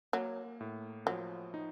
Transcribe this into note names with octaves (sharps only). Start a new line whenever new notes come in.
F#3 A#3
A2
F3 F#3
D#4